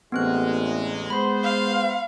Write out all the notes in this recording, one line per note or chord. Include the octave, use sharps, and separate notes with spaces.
A1 E2 G#3 B3 C4 F#6
G#3 B3 C5 B5 C6
F5